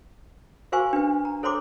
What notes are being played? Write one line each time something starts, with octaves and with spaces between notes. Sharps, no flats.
F#4 A#4 C5 F5 G#5 C#6
D4 B4
A#5
A4 C5 C#5 A#5 C6 D6